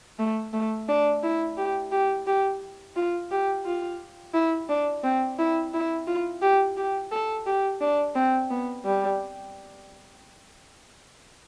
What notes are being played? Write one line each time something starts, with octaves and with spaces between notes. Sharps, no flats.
A3
A3
D4
E4
G4
G4
G4
F4
G4
F4
E4
D4
C4
E4
E4
F4
G4
G4
A4
G4
D4
C4
B3
G3